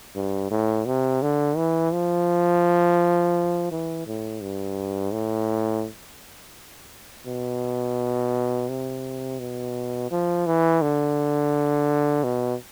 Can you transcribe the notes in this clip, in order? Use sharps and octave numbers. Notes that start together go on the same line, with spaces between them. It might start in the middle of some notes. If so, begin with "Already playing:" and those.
G2
A2
C3
D3
E3
F3
E3
A2
G2
A2
B2
C3
B2
F3
E3
D3
B2